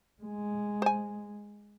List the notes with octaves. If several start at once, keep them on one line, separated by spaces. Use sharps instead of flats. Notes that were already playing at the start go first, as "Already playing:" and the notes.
G#3
C5 G#5